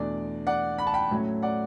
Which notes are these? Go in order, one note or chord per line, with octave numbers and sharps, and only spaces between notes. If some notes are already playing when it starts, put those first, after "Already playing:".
Already playing: E2 B2 A3 D4 D5
D5 F#5
B5
A5
G5 B5
A2 F#3 A3 C#4
D5 F#5